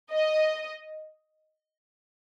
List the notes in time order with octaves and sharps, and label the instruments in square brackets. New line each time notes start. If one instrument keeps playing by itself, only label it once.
[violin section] D#5